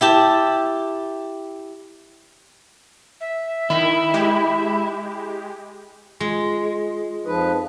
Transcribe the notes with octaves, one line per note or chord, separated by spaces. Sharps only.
E4 G4 A5
E5
D#3 E4
G#3 G4
G#3 F4
F2 F3 D#4 B4